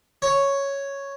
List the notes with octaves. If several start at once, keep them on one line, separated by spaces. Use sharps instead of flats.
C#5